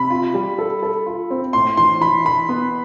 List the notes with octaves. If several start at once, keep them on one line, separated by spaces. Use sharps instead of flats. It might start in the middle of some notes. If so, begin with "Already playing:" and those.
Already playing: C3 B5
F4
G3
A4
A4
F4
C4
A2 C6
E3 C6
E3 B5
E3 B5
B3